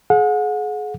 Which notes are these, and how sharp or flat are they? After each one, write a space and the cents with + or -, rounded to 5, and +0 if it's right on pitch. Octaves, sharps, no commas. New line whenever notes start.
G#4 +30 F#5 -35